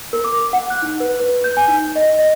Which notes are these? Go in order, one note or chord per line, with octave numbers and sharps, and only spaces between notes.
A#4
D6
F#5
F#6
D#4
B4
B4
G6
G#5
D#4
D#5
D#5